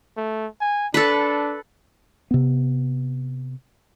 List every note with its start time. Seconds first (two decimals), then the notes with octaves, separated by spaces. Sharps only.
0.17 A3
0.61 G#5
0.94 D4 A4 B4
2.31 C3 B3